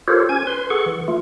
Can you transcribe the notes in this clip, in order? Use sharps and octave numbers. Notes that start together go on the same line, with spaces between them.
F4 G4 A4 A#4 C5 C#5
C#4 G#5 G#6
B4 C6
G#4 A4 F#5 C#6
E3
A3 F4